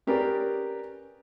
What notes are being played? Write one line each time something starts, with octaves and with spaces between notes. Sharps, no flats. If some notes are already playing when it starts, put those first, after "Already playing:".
C#4 G4 G#4 A#4 B4 D5